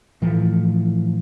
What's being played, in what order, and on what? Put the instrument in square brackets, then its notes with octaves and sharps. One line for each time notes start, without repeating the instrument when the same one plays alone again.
[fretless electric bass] A2 E3 F3 A3